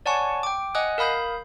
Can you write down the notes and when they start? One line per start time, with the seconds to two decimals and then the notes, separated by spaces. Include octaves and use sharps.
0.06 C#5 D5 F#5 G#5 A5 C#6
0.43 G5 D6
0.75 D#5 F#5 G#5 D#6 F#6
0.98 A#4 F5 B5 D#6 G6